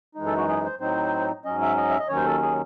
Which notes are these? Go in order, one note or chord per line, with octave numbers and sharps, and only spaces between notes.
F#2 E3 G#3 D#4
A4
F#4
G#4
C5
A2 F#3 C4 D#4 C5
G#2 F#3 C#4 D#5
E5
D#5
E5
D#5
D#2 D#3 F#3 C#4 C#5
C5
A4
G#4